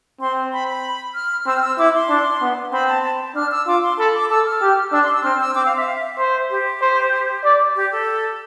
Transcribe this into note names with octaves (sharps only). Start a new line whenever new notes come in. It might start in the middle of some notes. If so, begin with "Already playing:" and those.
C4 C6
B5
B5
F6
C4 E6
F6
E6
E4 D6
C6
D4
B3
C4 B5
A5
A5
A5
D4 F6
E6
F4 D6
C6
A4 B5
D6
A4 E6
F6
G4
D4 E6
C6
E6
C4 F6
E6
C4 D6
F5
E5
F5
E5
C5
G4
C5
D5
G4
A4